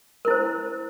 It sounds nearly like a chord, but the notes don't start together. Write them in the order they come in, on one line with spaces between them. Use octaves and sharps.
A#4 E4 C5